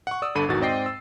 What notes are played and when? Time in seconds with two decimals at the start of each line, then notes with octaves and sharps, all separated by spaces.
0.07 F#5 C#6
0.22 D5 D#6 E6
0.35 G1 D3 A4 B5 D#7
0.48 G#1 E2 B2 D#3 F#4 A6
0.60 G#2 C4 D5 D#5 G5 C7
0.86 E6